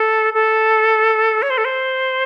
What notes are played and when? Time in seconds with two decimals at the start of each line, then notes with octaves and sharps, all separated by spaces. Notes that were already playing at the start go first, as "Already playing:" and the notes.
Already playing: A4
0.34 A4
1.42 C#5
1.50 C5
1.58 A4
1.65 C5